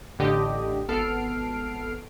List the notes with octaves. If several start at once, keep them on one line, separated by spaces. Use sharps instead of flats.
A1 D3 G4 D#5
G#1 B3 A4 F6 C7 D7